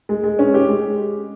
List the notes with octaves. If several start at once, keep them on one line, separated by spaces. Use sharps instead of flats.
G#3
G#3
C#4
G4
G#3